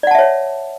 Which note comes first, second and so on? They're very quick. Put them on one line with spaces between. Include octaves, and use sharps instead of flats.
D5 F#5 A5 E5 C#5